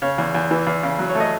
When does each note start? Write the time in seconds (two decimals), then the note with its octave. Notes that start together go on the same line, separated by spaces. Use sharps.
0.02 C#3 C#5
0.18 E2
0.35 E2
0.51 E3
0.67 E2
0.83 C#3
0.99 F#3
1.09 C#5
1.15 A3
1.20 D#5